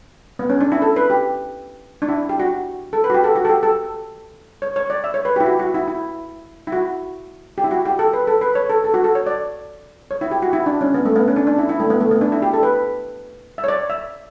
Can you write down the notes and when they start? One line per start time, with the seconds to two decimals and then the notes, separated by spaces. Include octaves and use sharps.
0.39 B3
0.50 C#4
0.61 D4
0.72 E4
0.82 A4
0.96 B4
1.10 G4
2.02 D4
2.09 E4
2.29 G4
2.40 F#4
2.93 A4
3.04 B4
3.10 F#4
3.14 G4
3.24 A4
3.36 F#4
3.45 A4
3.49 G4
3.63 A4
4.62 C#5
4.76 C#5
4.90 D5
5.04 E5
5.14 C#5
5.25 B4
5.36 G4
5.40 E4
5.46 F#4
5.60 F#4
5.74 E4
5.88 E4
6.67 E4
6.72 F#4
7.58 G4
7.64 E4
7.71 F#4
7.85 G4
7.99 A4
8.13 B4
8.27 A4
8.41 B4
8.55 C#5
8.70 A4
8.84 A4
8.94 F#4
9.04 A4
9.15 C#5
9.26 D5
10.11 C#5
10.21 E4
10.31 G4
10.42 F#4
10.53 E4
10.66 D4
10.81 C#4
10.94 B3
11.05 A3
11.16 B3
11.28 C#4
11.36 D4
11.47 D4
11.58 E4
11.69 E4
11.80 A3
11.90 B3
12.00 A3
12.11 B3
12.21 D4
12.32 E4
12.42 G4
12.54 A4
12.63 B4
13.58 E5
13.64 C#5
13.68 D5
13.90 E5